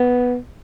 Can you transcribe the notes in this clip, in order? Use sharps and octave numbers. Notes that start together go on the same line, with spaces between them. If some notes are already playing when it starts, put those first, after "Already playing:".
Already playing: B3